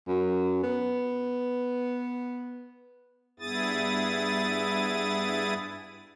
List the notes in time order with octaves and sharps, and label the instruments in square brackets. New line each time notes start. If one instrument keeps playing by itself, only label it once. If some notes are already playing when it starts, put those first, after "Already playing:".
[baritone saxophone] F#2
B3
[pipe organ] G2 B3 E4 G#4 D#6 A6